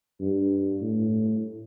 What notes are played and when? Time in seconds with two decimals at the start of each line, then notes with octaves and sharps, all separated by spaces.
0.21 G2
0.82 A2